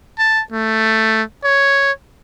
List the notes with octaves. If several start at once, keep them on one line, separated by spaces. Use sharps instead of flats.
A5
A3
C#5